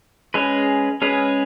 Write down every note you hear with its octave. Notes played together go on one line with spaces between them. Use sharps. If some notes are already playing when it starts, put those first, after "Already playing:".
G#3 C#4 G#4 B4
G#3 C#4 G#4 B4